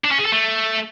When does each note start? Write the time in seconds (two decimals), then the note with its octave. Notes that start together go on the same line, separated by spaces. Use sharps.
0.04 D4
0.11 C#4
0.18 G#4
0.25 A4
0.32 A3